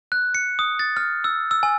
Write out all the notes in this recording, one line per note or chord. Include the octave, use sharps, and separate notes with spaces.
F#6
C#7
D#6
A6
F6
E6
E6
G#5